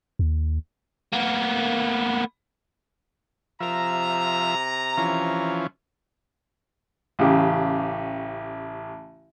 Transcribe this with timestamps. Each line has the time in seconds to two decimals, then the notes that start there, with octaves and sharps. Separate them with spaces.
0.19 D#2
1.13 A#3 B3
3.60 C3 F3 E5 A#5
4.97 E3 F3 C#4
7.19 A1 C#3 G4